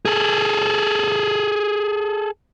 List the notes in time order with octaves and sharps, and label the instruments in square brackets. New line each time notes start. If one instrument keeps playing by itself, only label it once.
[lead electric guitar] G#4 A4